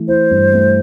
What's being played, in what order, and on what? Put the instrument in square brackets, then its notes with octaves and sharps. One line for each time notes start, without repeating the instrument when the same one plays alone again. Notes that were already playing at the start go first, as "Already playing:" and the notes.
Already playing: [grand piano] E3 A3
[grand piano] E4 [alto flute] C5
[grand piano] G2
A3